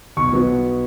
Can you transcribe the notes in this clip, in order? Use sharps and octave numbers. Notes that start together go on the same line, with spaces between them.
B1 C#6
B2 F#3 B3